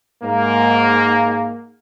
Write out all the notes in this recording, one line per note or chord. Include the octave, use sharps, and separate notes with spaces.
G#2 A#3